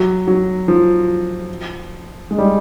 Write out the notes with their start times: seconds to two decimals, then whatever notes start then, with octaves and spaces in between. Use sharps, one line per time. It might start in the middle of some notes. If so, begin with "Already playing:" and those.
Already playing: F#3
0.27 F#3
0.68 F3
2.31 G#3
2.38 G3